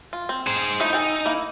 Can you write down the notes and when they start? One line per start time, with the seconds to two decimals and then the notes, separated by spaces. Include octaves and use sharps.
0.13 F4
0.29 C4
0.47 G#4 C5
0.80 F3 A3 D#4 E4
0.93 G#4 A4 G5
1.26 A#3 E4